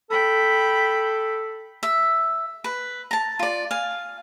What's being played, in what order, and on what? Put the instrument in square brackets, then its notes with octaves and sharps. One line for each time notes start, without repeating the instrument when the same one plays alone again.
[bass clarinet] A4 [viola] G5 B5
[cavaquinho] E5
B4
A5 A#5
F4 D5
F5 G#5